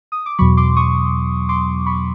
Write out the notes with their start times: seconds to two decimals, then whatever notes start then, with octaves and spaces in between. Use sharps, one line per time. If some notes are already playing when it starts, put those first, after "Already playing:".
0.12 D#6
0.26 D6
0.38 E2 B2 F#3 B5 C#6
0.57 C6 D6
0.76 C#6 D#6
1.49 C6 D6
1.86 B5 C#6